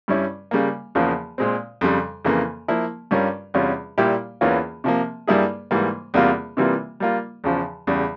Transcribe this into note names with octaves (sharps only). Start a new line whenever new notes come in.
G2 G3 C#4 E4
C#3 G3 A#3
E2 C#3 F3 A#3
A#2 G#3 C4
F2 C#3 G3
F2 C#3 E3 A#3
F3 A#3 E4
G2 G3 C#4 F4 A#4
E2 C3 G3 C#4 F4
A#2 G3 A#3 E4 G4
E2 E3 A#3 C#4 F4
C3 F3 A#3
G2 G3 A#3 E4 G#4
G#2 E3 G3 A#3
E2 C3 G3 A#3 F4
C3 E3 G3 A#3 F4
G3 A#3 F4
E2 C#3 F3
E2 C#3 G3